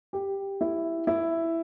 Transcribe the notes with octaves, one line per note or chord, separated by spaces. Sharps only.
G4
E4
E4